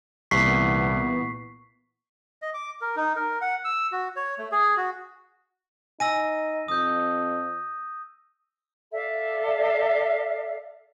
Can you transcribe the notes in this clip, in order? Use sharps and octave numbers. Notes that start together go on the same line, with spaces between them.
C2 A#2 E3 B3 C#6 B6 C7
D#5
D6
A#4
D#4
A#4
F#5
E6
F#4
C#5
A3
G#4
F#4
D#4 G#5 E6 A#6 D#7
F2 D#6 G6
A4 D5 E5 F5